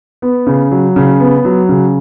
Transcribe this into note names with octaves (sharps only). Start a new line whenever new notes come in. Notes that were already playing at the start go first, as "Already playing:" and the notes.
B3
C#3
F#3
C#3
B3
F#3
C#3